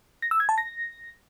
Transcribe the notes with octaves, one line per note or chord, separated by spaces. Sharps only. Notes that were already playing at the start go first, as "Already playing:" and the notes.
A#6
E6
G#6
A5
A#6